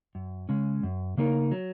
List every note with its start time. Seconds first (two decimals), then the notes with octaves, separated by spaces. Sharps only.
0.15 F#2
0.49 C#3 G#3 C#4
0.83 F#2
1.17 C#3 A#3 D#4 A#4
1.51 F#3